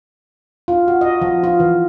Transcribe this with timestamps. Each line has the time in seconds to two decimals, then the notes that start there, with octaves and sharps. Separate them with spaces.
0.68 F4
0.88 F#4
1.01 D#5
1.22 F3
1.44 F4
1.60 E3